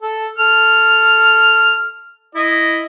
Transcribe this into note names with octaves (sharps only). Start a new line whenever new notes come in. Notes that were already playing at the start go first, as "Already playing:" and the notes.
A4
A4 F6
E4 D#5